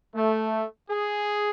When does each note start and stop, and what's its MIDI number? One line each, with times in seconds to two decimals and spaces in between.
0.15 0.66 57
0.90 1.51 68